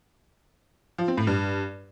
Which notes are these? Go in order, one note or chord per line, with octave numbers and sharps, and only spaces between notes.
F3
C4
A2
G2